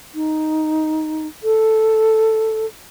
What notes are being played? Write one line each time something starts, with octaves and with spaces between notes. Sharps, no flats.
D#4
A4